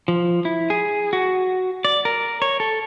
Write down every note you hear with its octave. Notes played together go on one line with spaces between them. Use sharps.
F3
E4
G#4
F#4
D5
A#4
C#5
A4